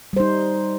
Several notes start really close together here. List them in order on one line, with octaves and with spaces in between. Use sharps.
G3 C5 D#4